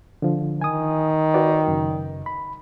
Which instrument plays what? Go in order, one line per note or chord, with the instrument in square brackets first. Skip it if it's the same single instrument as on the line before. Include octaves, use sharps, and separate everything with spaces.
[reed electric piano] D3 F3
[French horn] D#3 [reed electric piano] G#5 D#6
[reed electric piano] F#4 B4 D5
F#2 C#3
B5